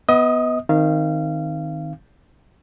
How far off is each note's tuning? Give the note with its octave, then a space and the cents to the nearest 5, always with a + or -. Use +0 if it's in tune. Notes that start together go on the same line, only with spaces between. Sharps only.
B3 +0 D#5 +30 D#6 -10
D#3 +0 C4 +0 F5 -25